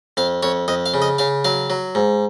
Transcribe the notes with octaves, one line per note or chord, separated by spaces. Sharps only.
F2 F5
F2 C#5
F2 D#5
F5
C#3
D#5
C#3 F5
F#3 F5
F#3
G#2